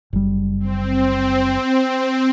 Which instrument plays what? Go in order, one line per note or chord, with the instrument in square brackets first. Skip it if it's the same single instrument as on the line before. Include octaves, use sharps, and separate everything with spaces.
[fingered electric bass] F#1 G3
[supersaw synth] C4